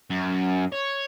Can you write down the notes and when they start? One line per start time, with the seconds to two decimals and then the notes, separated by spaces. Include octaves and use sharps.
0.10 F#2
0.72 C#5